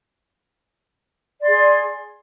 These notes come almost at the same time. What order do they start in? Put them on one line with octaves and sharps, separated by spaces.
D5 C6 G#4